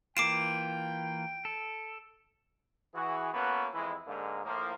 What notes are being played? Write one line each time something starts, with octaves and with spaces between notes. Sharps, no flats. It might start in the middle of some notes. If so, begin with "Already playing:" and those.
E3 A#3 F4 G5 D6 C7 D7 E7
A4
E3 F#4 G#4
A#3 B3 C#4 F#4 A4 B4
F2 E3 G#3 E4
G#2 D3 G#3 A#3
A2 F3 A#3